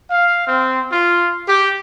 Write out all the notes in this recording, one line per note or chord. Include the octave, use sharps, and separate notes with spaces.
F5
C4
F4
G4